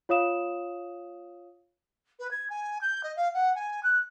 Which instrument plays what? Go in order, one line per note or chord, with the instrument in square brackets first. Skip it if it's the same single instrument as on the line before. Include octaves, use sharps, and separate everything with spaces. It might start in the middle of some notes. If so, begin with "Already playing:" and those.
[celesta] F4 C#5 F5 D#6 E7
[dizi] B4
G#6
G#5
G6
D#5
F5
F#5
G#5
F#6